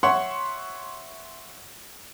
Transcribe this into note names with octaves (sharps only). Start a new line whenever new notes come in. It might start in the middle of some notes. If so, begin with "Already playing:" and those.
C#5 E5 F#5 C6 C#6